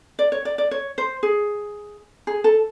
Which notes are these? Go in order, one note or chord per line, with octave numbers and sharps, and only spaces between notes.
D5
C#5
D5
D5
C#5
C5
G#4
G#4
A4